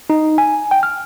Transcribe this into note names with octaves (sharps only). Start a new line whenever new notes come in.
D#4
G#5
G5
F6